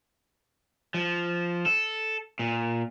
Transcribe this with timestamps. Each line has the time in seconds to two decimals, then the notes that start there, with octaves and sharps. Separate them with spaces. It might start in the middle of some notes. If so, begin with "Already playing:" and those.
0.94 F3
1.66 A4
2.39 A#2